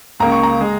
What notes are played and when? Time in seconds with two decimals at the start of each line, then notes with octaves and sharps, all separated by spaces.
0.20 C#2 C#3 A#3 A#5
0.32 C#6
0.43 A#5
0.61 G#3